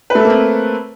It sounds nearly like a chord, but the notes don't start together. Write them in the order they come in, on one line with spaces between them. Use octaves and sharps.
B4 A3 A4 A#3 C4